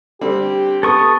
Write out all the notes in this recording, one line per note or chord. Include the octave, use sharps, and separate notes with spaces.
D3 G3 C4 G4
B3 A4 C#6 D#6